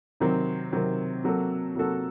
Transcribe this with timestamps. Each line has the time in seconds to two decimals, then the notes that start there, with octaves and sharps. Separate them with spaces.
0.20 C3 D#3 F#3 C4
0.72 C3 D#3 F#3 C4
1.24 C3 F#3 A#3 F#4 A4
1.75 C3 F#3 A#3 F#4 A4